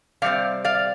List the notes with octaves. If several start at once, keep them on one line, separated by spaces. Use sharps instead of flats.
C3 G3 C4 D5 F5
D5 F5